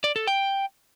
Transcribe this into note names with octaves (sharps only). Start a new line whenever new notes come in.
D5
A4
G5